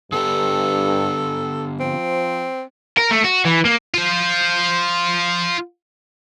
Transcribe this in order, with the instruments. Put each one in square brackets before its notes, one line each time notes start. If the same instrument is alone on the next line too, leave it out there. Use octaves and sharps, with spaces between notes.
[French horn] G2 [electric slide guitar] D3 B3 G4 [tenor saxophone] A4
[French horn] F3 [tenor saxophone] C4
[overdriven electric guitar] A#4
A3
F#4
E3
A#3
[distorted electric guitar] F4 C5